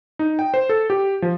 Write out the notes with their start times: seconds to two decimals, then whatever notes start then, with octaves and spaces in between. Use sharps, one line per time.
0.19 D#4
0.39 G5
0.54 C5
0.69 A4
0.90 G4
1.22 F3